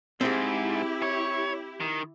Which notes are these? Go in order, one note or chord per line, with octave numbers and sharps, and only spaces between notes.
G#2 C4 E4 G4 G#4
C#5
D#3